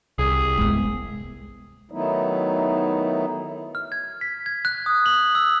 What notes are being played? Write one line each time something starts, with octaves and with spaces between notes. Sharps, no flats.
C2 G#4
G#3 B3
D#3 F#3 A3 B3 D#4 E4
F6
G#6
B6
G#6
F#6
D#6
F#7
E6